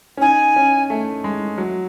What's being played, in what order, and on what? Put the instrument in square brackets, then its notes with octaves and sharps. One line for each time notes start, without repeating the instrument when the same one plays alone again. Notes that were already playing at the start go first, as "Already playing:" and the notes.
[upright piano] C#4
[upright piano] D#4 [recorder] G#5
[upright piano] C#4
A3
G#3
F#3